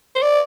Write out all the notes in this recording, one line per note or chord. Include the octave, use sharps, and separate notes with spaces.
C5
D5